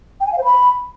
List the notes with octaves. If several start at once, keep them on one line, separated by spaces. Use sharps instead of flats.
G5
G#5
F5
C5
B5